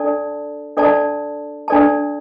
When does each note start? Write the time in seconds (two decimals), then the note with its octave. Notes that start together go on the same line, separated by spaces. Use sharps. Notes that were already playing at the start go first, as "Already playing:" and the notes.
Already playing: D4 A4 D5 A5
0.77 D4 A4 D5 A5
1.68 D4 A4 D5 A5